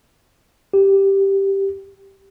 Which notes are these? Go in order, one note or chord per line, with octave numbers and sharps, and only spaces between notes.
G4